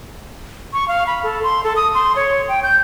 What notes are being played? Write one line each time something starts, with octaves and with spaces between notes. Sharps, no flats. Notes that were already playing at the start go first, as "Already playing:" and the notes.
C#6
F5
B5
A4
C6
A4
D#6
C6
C#5
G5
G6